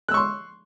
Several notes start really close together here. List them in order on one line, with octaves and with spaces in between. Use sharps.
F#6 E6 C#6 C6